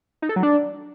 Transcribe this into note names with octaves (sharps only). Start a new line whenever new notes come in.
D#4
A4
F#3
D4